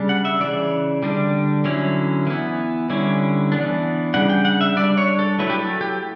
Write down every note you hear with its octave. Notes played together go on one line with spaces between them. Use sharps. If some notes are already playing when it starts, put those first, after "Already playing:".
Already playing: C#3 G3 D4
F#5
E5
C#3 E3 G3 D5
D3 G3 D4
D3 F#3 C#4 E4
E3 B3 E4
D3 G3 C#4 E4
E3 B3 D4
C#3 G3 D4 F#5
G5
F#5
E5
G3 D4 D5
C#5
A4
F#3 A3 E4 B4
G4
A4
G4